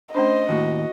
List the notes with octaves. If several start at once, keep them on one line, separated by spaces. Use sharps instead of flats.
A3 C#4 D4 C5 D#5
D#2 A2 F#4